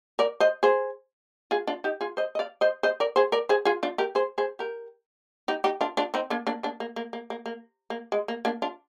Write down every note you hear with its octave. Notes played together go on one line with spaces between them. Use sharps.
A#4 D5
C5 D#5
G#4 C5
F4 G#4
D4 F4
D#4 G4
F4 G#4
C5 D#5
D#5
D5 F5
C5 D#5
C5 D#5
A#4 D5
G#4 C5
A#4 D5
G#4 C5
F4 G#4
D4 F4
G4 A#4
G#4 C5
G#4 C5
G4 A#4
D#4 G4
D#4 G4
D4 F4
D4 F4
C4 D#4
A#3 D4
A#3 D4
A#3 D4
A#3
A#3
A#3
A#3
A#3
A#3
G#3
A#3
A#3 D4
D4 F4